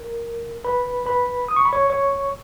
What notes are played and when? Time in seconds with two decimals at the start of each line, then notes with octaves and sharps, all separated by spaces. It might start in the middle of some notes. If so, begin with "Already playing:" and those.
Already playing: A#4
0.64 B4 B5
1.06 B4 B5
1.48 D#6
1.56 C#6
1.65 B5
1.73 C#5 C#6
1.90 C#5 C#6